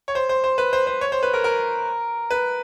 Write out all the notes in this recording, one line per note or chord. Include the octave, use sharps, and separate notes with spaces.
C#5
C5
C5
C5
B4
C5
C5
C#5
C5
B4
A#4
A#4
B4